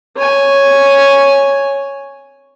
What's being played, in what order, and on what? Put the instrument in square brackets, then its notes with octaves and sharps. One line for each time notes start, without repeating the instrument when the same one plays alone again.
[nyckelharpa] C#5 G#5